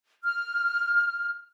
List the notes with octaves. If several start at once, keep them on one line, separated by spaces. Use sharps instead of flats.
F6